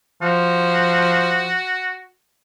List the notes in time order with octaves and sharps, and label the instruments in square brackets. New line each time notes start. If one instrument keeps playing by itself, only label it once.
[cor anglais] F3 [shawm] F#4